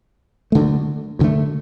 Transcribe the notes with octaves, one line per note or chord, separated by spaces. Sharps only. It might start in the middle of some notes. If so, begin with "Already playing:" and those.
D2 D3 A3
D2 D3 A3